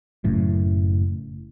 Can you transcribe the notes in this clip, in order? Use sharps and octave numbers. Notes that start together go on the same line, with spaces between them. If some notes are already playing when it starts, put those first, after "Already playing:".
F#1 F#2 A2